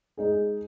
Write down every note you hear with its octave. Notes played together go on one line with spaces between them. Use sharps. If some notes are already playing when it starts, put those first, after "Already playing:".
G#3 D#4 G#4